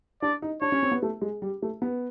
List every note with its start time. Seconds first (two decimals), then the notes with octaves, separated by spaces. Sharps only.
0.22 D4 D5
0.42 D#4
0.62 D4 C#5
0.72 C#4
0.83 C4
0.92 B3
1.03 A3
1.22 G#3
1.42 G3
1.62 A3
1.82 B3